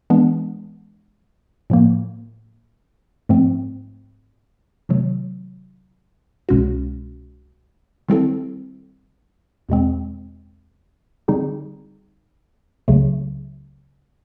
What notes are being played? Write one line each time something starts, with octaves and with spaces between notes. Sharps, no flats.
E3 G#3 B3 D4
A2 F3 A#3
G#2 F3 A3 C4
C3 D#3 F#3 A3
C2 B2 G#3 C#4 F#4
D#3 G3 C4 E4 A4
E2 B2 G#3 C4
D3 G3 C4 D#4 G#4
C#2 C#3 F#3 A3